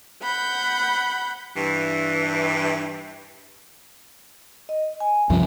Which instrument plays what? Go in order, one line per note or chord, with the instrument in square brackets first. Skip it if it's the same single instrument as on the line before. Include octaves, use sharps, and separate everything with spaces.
[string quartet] F#5 B5 G6
[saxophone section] G2 E3
[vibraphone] D#5
G#5
[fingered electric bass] C2 F#2 F3 [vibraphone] E5